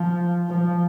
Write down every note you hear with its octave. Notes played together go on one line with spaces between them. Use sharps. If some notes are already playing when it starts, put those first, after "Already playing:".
Already playing: F3
F3